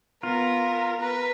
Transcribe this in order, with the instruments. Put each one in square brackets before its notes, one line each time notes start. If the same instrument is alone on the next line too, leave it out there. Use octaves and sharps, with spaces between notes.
[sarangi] B3 [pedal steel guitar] F4 [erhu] A#4
[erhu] A#4 [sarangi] B4